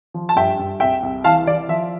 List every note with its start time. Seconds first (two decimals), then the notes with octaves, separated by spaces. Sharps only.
0.14 F3
0.29 A5
0.36 G2 E5 G5
0.59 G2
0.80 C2 E5 G5
1.03 C2
1.24 E3 F5 A5
1.46 E3 D5
1.69 F3 E5